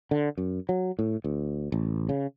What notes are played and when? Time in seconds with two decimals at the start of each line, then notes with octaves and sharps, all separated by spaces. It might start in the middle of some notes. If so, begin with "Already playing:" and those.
0.11 D3
0.38 F#2
0.69 F#3
0.99 A2
1.24 D2
1.72 A1
2.09 C#3